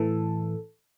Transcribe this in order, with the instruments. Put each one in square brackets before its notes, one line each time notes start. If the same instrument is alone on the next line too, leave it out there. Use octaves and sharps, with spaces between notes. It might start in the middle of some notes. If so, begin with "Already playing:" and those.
Already playing: [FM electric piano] A2 E3 A4